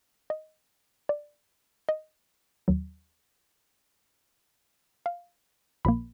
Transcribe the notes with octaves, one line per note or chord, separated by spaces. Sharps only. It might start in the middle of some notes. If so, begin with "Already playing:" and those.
D#5
D5
D#5
D#2 D#3 F#3
F5
A#1 A#2 F3 A#3 B5